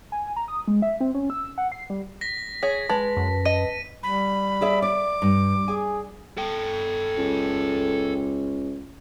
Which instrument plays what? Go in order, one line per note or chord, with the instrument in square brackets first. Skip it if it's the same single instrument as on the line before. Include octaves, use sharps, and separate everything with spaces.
[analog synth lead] G#5
A#5
D#6
G#3
E5
C4
C#4
E6
F#5
C7
G3
[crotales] A#6 B6
[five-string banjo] G#4 C#5
[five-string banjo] G#3 [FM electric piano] B4 A5
[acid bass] F#2
[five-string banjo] D#5 [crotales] D#7
[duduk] G3 [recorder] B5
[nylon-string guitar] G#4 D5 E5
[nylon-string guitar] D5 [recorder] D6
[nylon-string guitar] G2
[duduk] G#4 [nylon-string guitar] G#5
[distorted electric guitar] A4 G5
[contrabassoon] C#2